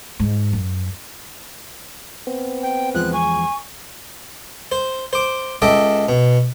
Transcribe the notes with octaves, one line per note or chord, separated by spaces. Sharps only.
G#2
F#2
B3 C4
G5
E2 F3 G#3 F4 F#6
G#5 C#6
C5
C5 D6
C#2 A4 D#5 E5 G5 D6
B2